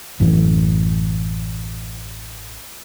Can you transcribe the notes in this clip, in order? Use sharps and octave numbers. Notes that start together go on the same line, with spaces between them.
A1 F#2 E3 A3